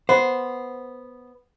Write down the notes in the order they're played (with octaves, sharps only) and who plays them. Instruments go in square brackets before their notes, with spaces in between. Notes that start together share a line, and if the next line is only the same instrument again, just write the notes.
[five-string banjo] B3 [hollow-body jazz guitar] C5